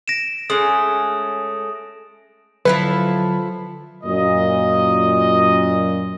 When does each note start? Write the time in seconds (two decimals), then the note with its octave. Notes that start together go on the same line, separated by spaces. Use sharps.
0.08 A#6 D7 E7
0.50 G#3 A3 C#4 D#6
2.65 D3 F3 F#3 E4 A4 B4
4.04 F#2 A#2 D#5